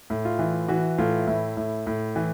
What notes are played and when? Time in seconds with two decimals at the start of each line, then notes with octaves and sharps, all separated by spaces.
0.10 A2
0.25 F4
0.39 E3
0.68 E3 F#4
0.98 A2 F4
1.27 A2 E4
1.57 A2
1.87 A2
2.16 E3